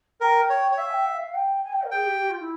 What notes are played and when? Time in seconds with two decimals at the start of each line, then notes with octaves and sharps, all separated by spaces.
0.21 A#4 G5
0.50 C#5
0.72 C#5
0.77 E5 F5
0.88 G#5
0.91 G5
1.06 F5
1.20 F5
1.34 G5
1.64 G#5
1.72 G5
1.82 A#4
1.91 G#4 G5
2.05 G4
2.20 G4
2.29 F4
2.39 E4